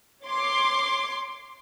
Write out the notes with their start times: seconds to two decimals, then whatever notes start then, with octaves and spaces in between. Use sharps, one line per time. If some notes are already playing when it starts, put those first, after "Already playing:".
0.24 C#5 C6 D6